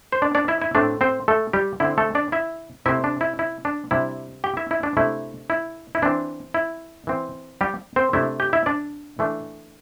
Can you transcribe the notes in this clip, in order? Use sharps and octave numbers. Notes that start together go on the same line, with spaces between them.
C5
D4 D5
D4 D5
E4 E5
E4 E5
A2 A3 C4 D4 D5
C4 C5
A3 A4
G3 G4
D3 C4 E4
A3 A4
D4 D5
E4 E5
C3 A3 C4 E4 E5
D4
E4
E4
D4
C3 G3 D4 E4
G4 G5
E4 E5
E4
D4
C3 A3 D4 E4
E4
E4
E3 C4 D4
E4
E3 C4
G3 G4
C4 C5
C3 A3 D4 E4 E5
G4 G5
E4 E5
D4 D5
E3 A3 D4